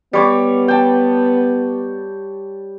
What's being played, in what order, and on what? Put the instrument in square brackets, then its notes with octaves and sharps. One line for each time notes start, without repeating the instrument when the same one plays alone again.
[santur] G3 C#5 D6 [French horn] B3
[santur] G5 A5